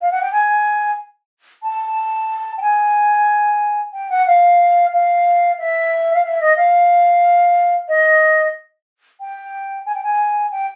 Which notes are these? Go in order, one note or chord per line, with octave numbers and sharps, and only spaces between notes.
F5
F#5
G5
G#5
A5
G5
G#5
G5
F#5
F5
F5
E5
F5
E5
D#5
F5
D#5
G5
G#5
G5
G#5
G5